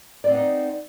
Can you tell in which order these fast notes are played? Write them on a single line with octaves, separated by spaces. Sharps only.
D5 C4 B3 D#4